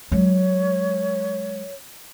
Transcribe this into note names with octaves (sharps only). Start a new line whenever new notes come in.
F#3 G#3 C#5